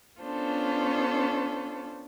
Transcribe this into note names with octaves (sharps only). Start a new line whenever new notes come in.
B3 C#4 D4 F4 A4 C5